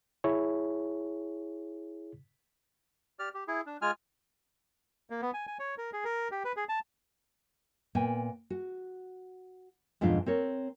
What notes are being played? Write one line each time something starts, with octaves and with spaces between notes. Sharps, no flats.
E4 G#4 C#5
G4 D5 F6
G4
E4 G#4
D4
G#3 F4 G#5 F6
A#3
B3
G#5
G#5
C#5
A#4
G#4
A#4
G4
B4
G#4
A5
A#2 B3 G5 G#5
F#4
F2 G#2 B2 D4 F4
C4 A#4 C#5